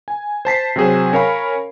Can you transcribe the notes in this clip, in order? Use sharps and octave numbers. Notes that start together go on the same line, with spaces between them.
G#5
C5 A5 B6 C7
C3 F#3 G#4 C5
C#4 A#4 C#5 F5 B5